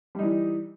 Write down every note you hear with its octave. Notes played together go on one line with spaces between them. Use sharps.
E3 G3 D#4